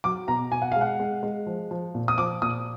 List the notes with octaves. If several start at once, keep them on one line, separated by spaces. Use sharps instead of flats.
F#3 D6
B2 A#5
B2 G#5
F#5
G#3 F5
F#5
G#3
G#3
F3
F3
A#2
D#6
F3 D6
A#2 D#6